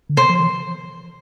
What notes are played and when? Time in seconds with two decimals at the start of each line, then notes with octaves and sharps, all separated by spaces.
0.09 D3
0.17 C3 C5
0.29 F3
0.40 E3